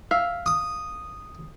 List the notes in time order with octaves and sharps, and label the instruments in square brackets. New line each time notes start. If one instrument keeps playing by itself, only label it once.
[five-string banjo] E5 F5
[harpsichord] D#6